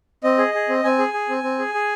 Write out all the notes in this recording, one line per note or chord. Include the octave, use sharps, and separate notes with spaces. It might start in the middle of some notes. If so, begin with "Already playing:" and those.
C4 D#5
G#4
G#4
C4
C4 G#5
G#4
G#4
C4
C4
G#4
G#4